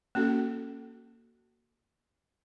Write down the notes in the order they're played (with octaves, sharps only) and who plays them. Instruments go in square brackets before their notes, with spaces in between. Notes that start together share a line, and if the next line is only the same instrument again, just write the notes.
[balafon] A#3 C#4 F#4 A4